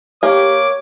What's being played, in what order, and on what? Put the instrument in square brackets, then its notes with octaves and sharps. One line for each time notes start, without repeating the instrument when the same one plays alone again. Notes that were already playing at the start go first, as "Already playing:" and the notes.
[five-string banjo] A#3 [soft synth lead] G4 [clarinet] C#5 [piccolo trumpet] D6